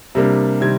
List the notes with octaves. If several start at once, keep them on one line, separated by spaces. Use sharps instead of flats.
C3 G3 A#3 D4
C3 D#3 G3 C4 G#6